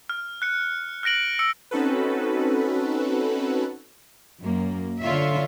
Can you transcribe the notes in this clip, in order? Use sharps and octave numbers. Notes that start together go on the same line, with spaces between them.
F6
F#6 C#7
F6 F#6 A#6 D7 F#7
E6 C#7 F#7
C4 C#4 D#4 F#4 A4 B4
F#2 A#3
D3 F4 C#5 E5